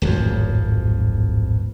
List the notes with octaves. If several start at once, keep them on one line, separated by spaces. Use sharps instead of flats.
D1 G#1 F2